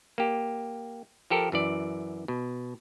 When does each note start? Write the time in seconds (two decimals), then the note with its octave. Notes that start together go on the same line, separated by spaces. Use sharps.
0.18 A#3 G4
1.30 F3 G4 A4 A#4
1.52 F#2 E3 D5
2.28 B2